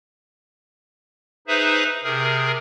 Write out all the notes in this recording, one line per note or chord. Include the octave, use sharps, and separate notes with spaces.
D#4 G#4 B4 C5 E5
C3 G#4 A#4